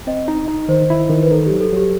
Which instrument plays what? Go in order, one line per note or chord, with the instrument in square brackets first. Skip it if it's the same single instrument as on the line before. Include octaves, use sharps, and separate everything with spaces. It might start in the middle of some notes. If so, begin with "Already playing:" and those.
[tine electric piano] C4 [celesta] D#5
[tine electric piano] D#4
D#4
[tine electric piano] D#3 [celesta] C5
[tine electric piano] E4
D#3
[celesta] B4
[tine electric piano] D#4 [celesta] A4
[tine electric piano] F#3 [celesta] G4
[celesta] A4
[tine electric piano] F#3 [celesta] G4